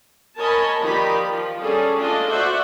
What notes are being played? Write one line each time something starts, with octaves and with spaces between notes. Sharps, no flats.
A#4 C#5 D#5 G#5 A5 B5
D#3 F3 D#4 G4 D5 B5
F3
G3 C#4 G#4 A4 D5
A3 D4 F4 G#4 D5 D#5
F#4 C5 D5 E5 F#5